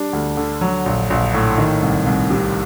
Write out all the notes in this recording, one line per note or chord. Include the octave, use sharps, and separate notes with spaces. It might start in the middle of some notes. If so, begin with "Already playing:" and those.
Already playing: G3 D4
D2
D3
F#3
A#1
A#1
A2
D#3
C2
C2
C3